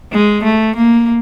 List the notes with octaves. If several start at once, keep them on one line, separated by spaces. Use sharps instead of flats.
G#3
A3
A#3